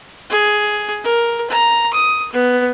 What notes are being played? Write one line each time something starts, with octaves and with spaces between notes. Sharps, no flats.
G#4
A#4
A#5
D#6
B3